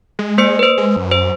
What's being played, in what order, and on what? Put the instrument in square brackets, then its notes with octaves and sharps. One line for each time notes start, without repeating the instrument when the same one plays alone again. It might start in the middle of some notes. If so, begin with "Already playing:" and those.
[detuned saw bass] G#3
[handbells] A#3 C5 C#7
B4 C5
[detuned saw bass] G#3
F#2
[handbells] C5